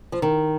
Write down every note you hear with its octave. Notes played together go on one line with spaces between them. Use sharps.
F3
D#3